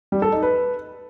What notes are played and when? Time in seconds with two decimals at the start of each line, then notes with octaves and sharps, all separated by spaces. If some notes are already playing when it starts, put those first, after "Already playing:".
0.12 G3
0.22 A4
0.32 D#4
0.42 B4